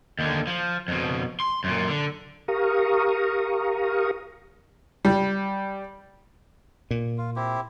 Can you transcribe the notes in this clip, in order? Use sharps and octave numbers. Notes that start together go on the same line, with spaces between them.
D#2 D3
F3
F2 B2
C6
F#2 A#2
D3
G4 A#4 F5 A#5 C#6 D#6
G3
A#2
F4
C4 E4 G4